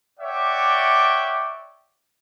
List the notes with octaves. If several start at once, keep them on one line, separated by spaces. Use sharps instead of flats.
C#5 D5 E5 F#5 G5 D6